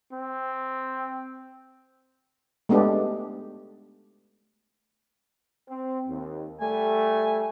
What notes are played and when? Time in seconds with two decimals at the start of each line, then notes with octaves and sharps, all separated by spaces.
0.13 C4
2.69 G#3 A3 B3 D4 G4
5.69 C4
6.08 D#2
6.61 G3 A3 G#5